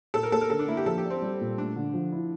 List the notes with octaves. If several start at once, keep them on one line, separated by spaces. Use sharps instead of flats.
A#2 A4
A#4
A#3 A4
A#4
D3 A4
D4
A#3 E4
G4
F3 A4
G4
D4
C4
G3
A#2
A3 D4
D3
F3
E4